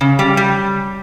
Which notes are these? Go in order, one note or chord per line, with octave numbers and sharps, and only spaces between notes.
C#3
G3
G3